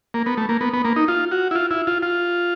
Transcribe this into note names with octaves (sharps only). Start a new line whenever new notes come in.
A#3
B3
A3
A#3
B3
B3
A#3
D#4
F4
F#4
E4
F4
E4
F4
F4